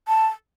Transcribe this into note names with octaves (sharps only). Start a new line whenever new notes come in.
A5